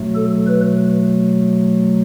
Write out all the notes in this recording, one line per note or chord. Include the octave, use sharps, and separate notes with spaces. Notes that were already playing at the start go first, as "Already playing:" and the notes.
Already playing: B2 F#3 A3
A4
B4